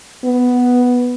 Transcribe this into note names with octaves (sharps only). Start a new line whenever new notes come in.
B3